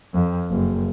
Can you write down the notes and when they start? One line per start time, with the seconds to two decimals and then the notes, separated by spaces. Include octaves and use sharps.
0.14 F2
0.50 F#1